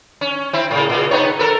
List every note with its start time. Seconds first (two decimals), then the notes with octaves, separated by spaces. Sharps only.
0.21 C#4
0.53 C4 E4
0.71 A2 C#3
0.89 A#2 C#3
1.11 B3 D#4 C#5
1.39 A4 A#4